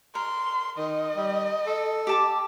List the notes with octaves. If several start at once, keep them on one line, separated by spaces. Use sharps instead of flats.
A#4 C6
D#3 D#5
G3
A4
G4 A5 D6